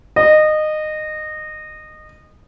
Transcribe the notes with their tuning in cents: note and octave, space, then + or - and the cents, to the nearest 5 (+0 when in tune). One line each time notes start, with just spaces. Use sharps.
D#5 -20